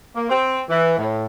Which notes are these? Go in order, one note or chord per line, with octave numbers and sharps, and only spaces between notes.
A#3
C4
E3
A2